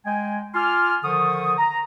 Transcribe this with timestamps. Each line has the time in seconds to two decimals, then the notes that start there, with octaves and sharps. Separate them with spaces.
0.05 G#3 G5 G#5
0.55 F4 G#5 C6 D6 F6
1.03 D3 D#3 F3 C#6 D#6
1.58 A#5